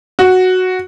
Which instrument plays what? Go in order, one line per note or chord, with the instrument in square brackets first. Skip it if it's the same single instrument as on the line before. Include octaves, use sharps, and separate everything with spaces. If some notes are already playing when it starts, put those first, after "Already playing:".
[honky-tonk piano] F#4